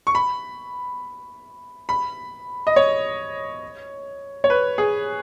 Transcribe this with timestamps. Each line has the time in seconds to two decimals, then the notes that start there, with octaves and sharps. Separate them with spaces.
0.07 C#6
0.15 B5
1.89 B5
2.67 D#5
2.76 C#5
4.44 C#5
4.50 B4
4.78 G#4